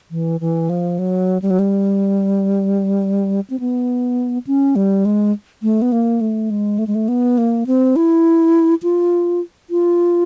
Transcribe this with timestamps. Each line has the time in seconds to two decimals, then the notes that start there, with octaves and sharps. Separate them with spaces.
0.11 E3
0.40 E3
0.70 F3
0.99 F#3
1.42 G3
1.50 F#3
1.59 G3
3.50 C4
3.60 B3
4.47 C#4
4.76 G3
5.05 G#3
5.63 A3
5.82 B3
5.92 A#3
6.21 A3
6.50 G#3
6.79 A3
6.87 G#3
6.95 A3
7.08 B3
7.38 A#3
7.67 C4
7.96 E4
8.83 F4
9.70 F4